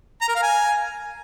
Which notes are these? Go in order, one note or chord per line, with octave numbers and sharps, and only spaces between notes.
A#5
A#4
F5
G#5